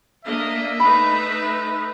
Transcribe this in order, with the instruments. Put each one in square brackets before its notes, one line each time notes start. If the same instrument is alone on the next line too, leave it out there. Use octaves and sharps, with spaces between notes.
[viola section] A#3 D4 D#5 [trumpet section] E5
[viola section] A3 D#4 B4 [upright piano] B5